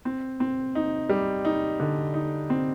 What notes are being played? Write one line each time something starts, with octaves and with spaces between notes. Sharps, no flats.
C4
C4
D#4
G3
D#4
D3
D#4
C4